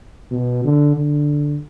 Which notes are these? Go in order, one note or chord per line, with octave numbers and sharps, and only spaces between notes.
B2
D3
D3